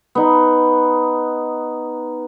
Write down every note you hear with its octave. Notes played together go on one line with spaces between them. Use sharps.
B3 D#4